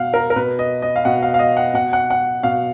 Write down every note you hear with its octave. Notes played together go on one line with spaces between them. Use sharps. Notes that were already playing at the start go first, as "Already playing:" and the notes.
Already playing: B2 F5 F#5
A#4
A#4
B2 B4
D#5
D#5
F5
B2 F#5
F5
F5
D#5
F#5
B2 F#5
F#5
F#5
B2 F5